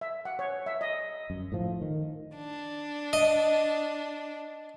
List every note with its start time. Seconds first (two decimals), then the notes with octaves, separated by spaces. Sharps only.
0.01 E5
0.25 F#5
0.39 C#5
0.66 E5
0.81 D#5
1.30 F#2
1.52 A2 F3
1.82 D#3
2.36 D4
3.13 D#5